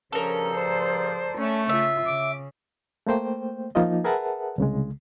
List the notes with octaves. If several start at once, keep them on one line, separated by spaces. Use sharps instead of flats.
G2 C#3 F3 C#4 A4 A#4
C5 D5
A3 C#4
C#3 F4 E5
C#3 D6
A3 A#3 C5 G5
F3 A#3 D#4 F4 D#5
G#4 A#4 B4 E5 F#5 A5
C2 C#3 G#3